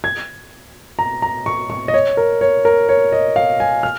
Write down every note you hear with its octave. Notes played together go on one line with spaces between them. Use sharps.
G#6
A#5
A#5
C#6
C#6
D#5
C#5
A#4
C#5
A#4
C#5
D#5
F5
G#5
F6